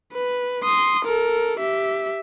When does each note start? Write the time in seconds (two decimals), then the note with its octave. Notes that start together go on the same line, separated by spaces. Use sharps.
0.12 B4
0.64 C6 D#6
1.05 A4 A#4
1.59 G4 E5